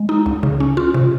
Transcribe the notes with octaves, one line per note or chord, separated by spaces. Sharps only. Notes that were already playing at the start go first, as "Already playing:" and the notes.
Already playing: G#3
D#4
C#2
C#3
C#4
F4
C3